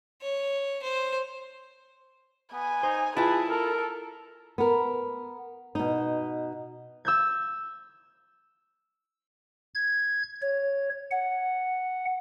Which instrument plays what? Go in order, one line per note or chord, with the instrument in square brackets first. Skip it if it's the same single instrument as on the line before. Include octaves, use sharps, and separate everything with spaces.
[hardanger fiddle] C#5
C5
[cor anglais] B3 [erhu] G#5
[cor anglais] D#4 [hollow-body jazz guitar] C5
[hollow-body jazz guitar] E4 F4 [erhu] G#4 [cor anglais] B4 [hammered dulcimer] A5
[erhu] A4 [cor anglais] A#4
[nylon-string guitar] B3 A#4
B2 D#4
[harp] E6 G6 G#6
[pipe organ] G#6
C#5
F#5